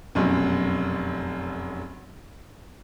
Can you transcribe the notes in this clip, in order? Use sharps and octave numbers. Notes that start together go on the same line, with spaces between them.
F1 B1 F#2